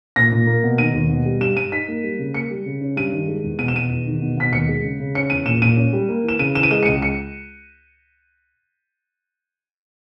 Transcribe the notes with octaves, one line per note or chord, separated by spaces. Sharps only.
A#2 A#6
A#2
A#3
B2
D#3 D#7
D#2
B2
G3
G2 E7
G2 D#7
D#4 B6
A#3
G3
C#3
A#3 C#7
G3
C#3
C#4
G2 D#7
D#3
G#3
E2
B2 D#7
E7
B2 D#7
E2
D#3
B2
B2 B6
D#2 C#7
G#3
C#3
C#3
C#4 C#7
E2 D#7
A#2 E7
A#2 D#7
C#4
G3
A#3
E3 E7
C#3 D#7
E3 E7
D#7
G#3 E7
C#7
C#2 D#7
C#7